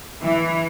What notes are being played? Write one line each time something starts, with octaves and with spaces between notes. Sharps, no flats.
E3